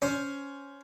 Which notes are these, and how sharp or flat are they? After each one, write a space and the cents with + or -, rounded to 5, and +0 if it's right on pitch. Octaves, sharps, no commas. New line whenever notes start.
C#4 +10 C5 +0